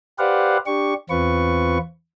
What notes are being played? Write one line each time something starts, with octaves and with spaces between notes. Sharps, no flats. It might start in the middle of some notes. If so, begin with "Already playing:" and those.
G4 B4 C5 D5 F5 F#5
D4 G4 C#6
E2 C4 F4 B4 C#6